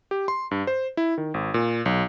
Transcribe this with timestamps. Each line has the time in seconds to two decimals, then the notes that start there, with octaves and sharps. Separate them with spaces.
0.11 G4
0.28 C6
0.51 G2
0.67 C5
0.97 E4
1.18 D#3
1.34 G#1
1.54 A#2
1.86 B1